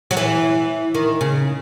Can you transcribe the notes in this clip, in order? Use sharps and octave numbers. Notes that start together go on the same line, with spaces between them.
F#3
E3
D#3
C#3